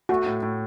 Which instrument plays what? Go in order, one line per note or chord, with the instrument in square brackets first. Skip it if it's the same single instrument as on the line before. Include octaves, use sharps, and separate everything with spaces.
[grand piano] A3 [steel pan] F#4
[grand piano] A2
A2